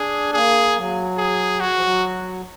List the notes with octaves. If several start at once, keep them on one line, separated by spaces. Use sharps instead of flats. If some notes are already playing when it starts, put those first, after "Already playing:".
Already playing: D4 G#4
A#3 G#4
F#3
G#4
F#4
F3
F#3